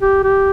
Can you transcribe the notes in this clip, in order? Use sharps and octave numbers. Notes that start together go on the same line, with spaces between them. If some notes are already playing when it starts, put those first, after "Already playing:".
G4
G4